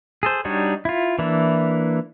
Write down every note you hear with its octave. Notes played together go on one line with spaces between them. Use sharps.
G#4 A4 C5
G3 D4 D#4 F#4 C#5
E4 F4
E3 A#3 D4 E4